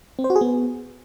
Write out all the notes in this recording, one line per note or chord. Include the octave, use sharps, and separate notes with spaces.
C4
C5
F#4
G#4
B3